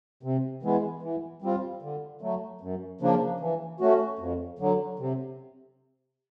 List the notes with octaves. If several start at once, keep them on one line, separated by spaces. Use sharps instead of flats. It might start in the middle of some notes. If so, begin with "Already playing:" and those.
C3
E3 G#3 B3 E4
E3
G3 C4 F4
D3
F#3 A3
F#2
C#3 F3 A#3 D4
E3
A3 C#4 F#4
F2
D3 F#3
C3